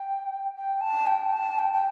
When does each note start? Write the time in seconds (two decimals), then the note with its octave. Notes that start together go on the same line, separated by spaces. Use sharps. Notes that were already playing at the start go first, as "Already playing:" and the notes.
Already playing: G5
0.56 G5
0.81 A5
1.07 G5
1.32 A5
1.59 G5
1.73 G5